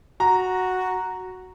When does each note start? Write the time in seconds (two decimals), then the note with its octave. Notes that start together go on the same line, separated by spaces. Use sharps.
0.20 F#4 A#5